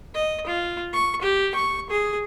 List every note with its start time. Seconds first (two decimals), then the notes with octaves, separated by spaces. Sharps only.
0.14 D#5
0.47 F4
0.93 C#6
1.22 G4
1.55 C#6
1.90 G#4